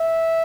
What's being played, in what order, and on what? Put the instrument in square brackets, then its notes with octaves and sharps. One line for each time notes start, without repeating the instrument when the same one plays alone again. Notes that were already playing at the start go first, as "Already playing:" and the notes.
Already playing: [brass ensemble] E5